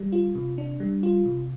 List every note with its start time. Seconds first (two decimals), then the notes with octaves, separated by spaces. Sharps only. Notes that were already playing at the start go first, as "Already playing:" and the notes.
Already playing: G3
0.12 F4
0.35 C3
0.58 D4
0.80 G3
1.03 F4
1.26 C3